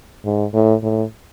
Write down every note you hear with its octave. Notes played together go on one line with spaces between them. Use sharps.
G#2
A2
A2